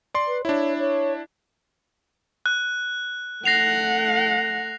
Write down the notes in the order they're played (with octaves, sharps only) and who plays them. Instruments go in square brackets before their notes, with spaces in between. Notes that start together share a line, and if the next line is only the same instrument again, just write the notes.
[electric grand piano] D5 C6
[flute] B4
[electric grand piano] D4 E4 [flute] C#5
[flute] C#5
[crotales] F#6
[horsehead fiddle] A3 F#5 [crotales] A#6 C7 F7